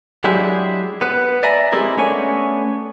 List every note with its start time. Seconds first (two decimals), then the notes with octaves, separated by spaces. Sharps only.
0.24 F#3 G#3 D4 E4 G4 G#4
1.01 B3 B4
1.43 D5 E5 G#5 A#5 B5
1.72 G#3 C4 E4 G4 G#4 A#4
1.97 A3 B3 C#4 D4 C#5 G#5